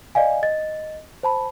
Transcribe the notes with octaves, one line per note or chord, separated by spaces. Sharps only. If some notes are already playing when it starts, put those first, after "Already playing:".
D5 D#5 F5 G#5
D#5 A6
C5 A5 B5